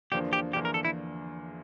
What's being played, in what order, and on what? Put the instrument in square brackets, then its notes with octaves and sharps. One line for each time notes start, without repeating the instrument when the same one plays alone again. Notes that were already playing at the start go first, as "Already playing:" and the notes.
[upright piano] E2 D3 F3 A#3 D4 [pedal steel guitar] G4
[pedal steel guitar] G4
[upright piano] E2 D3 F3 A#3 D4 [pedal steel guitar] G4
[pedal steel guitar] A#4
A4
E4